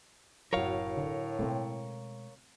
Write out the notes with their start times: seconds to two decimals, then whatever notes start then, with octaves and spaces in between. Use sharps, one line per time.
0.53 F#1 A2 C3 F#3 F#4 A#4 C#5 F5
0.97 D3
1.39 B2 G#3 A3 C4